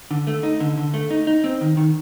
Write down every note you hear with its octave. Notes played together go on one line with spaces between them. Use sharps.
D3
A3
D#4
D3
D3
A3
D#4
D#4
C4
D#3
D#3